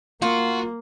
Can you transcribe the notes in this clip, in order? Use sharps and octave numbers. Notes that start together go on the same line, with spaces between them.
A#3 F4 F#4